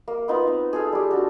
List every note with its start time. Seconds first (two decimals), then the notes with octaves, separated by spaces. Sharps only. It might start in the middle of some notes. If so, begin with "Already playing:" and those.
0.08 A#3
0.28 B3 D#4 F4 B4
0.48 C4
0.73 G#4 A4 F5
0.92 G3 G4
1.11 D4 F#4 A4